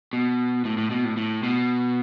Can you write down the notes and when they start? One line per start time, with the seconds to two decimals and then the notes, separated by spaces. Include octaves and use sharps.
0.13 B2
0.65 A2
0.78 A2
0.91 B2
1.05 A2
1.17 A2
1.43 B2